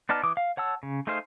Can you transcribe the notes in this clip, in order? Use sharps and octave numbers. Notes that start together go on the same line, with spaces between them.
B3 D#4 D5 A5 F6
E3 D6 D#6
F5
C#5 F#5 A5 E6
C#3
A3 D#4 G#4 C5 F5